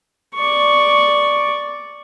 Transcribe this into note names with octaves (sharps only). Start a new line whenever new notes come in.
D5 C#6